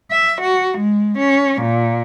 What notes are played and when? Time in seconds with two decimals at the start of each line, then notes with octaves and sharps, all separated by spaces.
0.11 E5
0.42 F#4
0.78 G#3
1.19 C#4
1.62 A#2